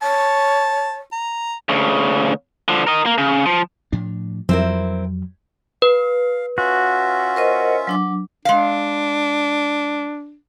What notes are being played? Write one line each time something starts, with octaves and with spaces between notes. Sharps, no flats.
C#5 A5
A#5
D2 C#3
D3 F3
A#4 D#5
A#3
C#3
F3
A2 F3 D4
F2 F#3 G3 C4 E4 A#4
B4 F5
C#4 F4 F#4 E5
A#4 C5 D#5
F#3 D4 D6
G#3 D4 F5